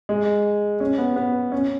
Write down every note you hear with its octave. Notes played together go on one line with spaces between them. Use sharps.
G#3
C#4
B3
B3
C#4